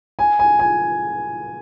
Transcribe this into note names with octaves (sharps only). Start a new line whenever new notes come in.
G#5
G#5
G#5